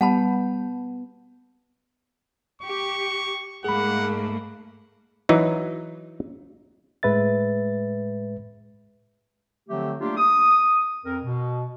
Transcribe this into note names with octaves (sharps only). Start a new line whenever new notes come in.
G3 B3 F#5 A5 B5
G4 C#6
G#2 A3 A#3 G#4 F#5 B5
E3 F#3 D#4
A2 G#3 B4 E5 A6
D3 F3 F#3 A3 C4 G4
A3 A#3 D4 F4 G4
D#6
F2 A#4
B2